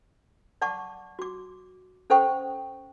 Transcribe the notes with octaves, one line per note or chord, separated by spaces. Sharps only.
D5 F#5 A5 C#6 D6
F#4 D6
C#4 A4 C5 F#5 G5 C#6